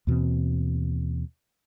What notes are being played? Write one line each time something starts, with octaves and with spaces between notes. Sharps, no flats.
D#2 B2 E3 C4